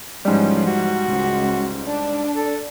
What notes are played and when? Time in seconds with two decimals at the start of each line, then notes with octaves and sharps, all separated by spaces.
0.25 G#2 E3 F3 G3 C#4
0.66 F#4
1.08 C#2
1.87 D4
2.35 A4